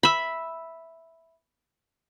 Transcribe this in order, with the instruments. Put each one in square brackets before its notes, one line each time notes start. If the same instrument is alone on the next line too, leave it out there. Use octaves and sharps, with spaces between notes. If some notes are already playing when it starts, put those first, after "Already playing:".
[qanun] E5 B5